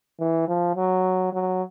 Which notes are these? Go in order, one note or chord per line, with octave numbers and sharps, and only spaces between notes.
E3
F3
F#3
F#3